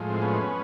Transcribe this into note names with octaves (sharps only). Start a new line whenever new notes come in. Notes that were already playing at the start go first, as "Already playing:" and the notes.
Already playing: A2 F3 G#3
C4
B3 C#4